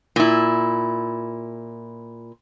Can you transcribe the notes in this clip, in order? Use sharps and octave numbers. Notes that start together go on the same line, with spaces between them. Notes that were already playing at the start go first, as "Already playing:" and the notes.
A#2 E4